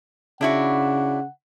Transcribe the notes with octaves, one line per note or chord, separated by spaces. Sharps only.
C#3 D4 E4 F#4 F#5